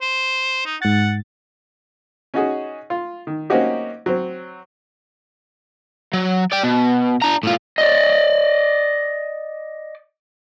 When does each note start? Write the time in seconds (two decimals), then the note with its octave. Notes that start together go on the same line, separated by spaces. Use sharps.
0.01 C5
0.66 D#4
0.82 G#2 F#5 A6
2.34 C#4 D#4 F#4 G#4
2.90 F4
3.27 D#3
3.50 A#3 C4 C#4 D#4 F#4 G4
4.06 F#3 C4
6.13 F#3
6.52 D5 G5
6.64 B2
7.22 D4 A#5
7.43 A2 F4
7.78 D5 D#5